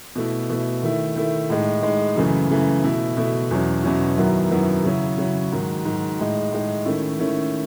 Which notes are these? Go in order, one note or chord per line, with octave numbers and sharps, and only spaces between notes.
B2 A3 E4
B2 A3 E4
D#3 A3 E4
D#3 A3 E4
A2 G#3 D#4
A2 G#3 D#4
F#2 C#3 E3 A3
F#2 C#3 E3 A3
B2 A3 E4
B2 A3 E4
E2 B2 F#3 C#4 E4
E2 B2 F#3 C#4 E4
F#2 D#3 F#3 B3 E4
F#2 D#3 F#3 B3 E4
C#3 F#3 C#4 E4
C#3 F#3 C#4 E4
G#2 D#3 F#3
G#2 D#3 F#3
A2 G#3 D#4
A2 G#3 D#4
D#3 A3 C#4 E4
D#3 A3 C#4 E4